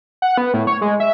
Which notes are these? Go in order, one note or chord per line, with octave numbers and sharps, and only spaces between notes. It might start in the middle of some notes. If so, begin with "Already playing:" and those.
F#5
B3
A2
C#5
G#3
E5